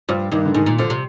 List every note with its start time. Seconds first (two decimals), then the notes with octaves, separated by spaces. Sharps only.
0.09 G2 F3
0.32 G2 D#3
0.45 D3
0.54 G#2 D#3
0.66 A#2
0.78 D3 F3
0.90 C3